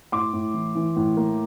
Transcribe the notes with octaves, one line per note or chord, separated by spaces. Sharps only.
A2 C6 D6
A2
E3
E3
A2
A#3